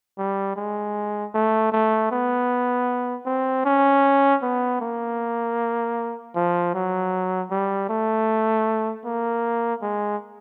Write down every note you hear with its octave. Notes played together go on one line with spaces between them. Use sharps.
G3
G#3
A3
A3
B3
C4
C#4
B3
A#3
F3
F#3
G3
A3
A#3
G#3